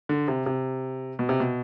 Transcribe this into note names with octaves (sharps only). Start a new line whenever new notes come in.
D3
C3
C3
B2
C3
B2